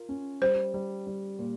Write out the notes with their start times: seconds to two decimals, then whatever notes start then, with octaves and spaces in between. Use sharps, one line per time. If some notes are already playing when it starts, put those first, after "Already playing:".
Already playing: F4 A#4
0.09 C#4
0.41 G3 C5
0.74 G3
1.07 G3
1.39 A#2